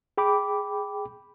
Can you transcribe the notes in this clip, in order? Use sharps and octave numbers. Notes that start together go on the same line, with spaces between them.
G#4 G5 B5 D6